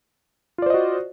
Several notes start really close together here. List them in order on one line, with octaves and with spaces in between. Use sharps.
F4 D5 C5 D#5 F#4